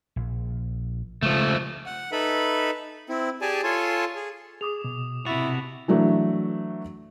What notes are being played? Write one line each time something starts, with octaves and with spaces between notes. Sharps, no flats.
A#1
C#3 F3 G#3 A3
F#5
D#4 A4 B4 E5 B5
C4 E4
G4 G#4 D5 G#5 A5
F4 A4 C#5 G#5 A5 C6
G#4
G#4 D6 D#6 F7
B2
C3 E4 F#4 A6 F7
E3 F#3 A3 D4 F#4